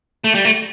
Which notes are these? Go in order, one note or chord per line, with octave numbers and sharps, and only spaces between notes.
A3
G3
A3